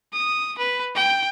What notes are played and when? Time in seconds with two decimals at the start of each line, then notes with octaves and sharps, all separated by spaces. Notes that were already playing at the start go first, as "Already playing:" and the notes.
0.13 D#6
0.58 B4
0.95 G5